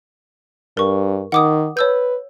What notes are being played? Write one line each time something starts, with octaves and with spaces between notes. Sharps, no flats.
G2 A#4 C#6
D#3 F#5 D6 D#6
B4 C#5 E6 G6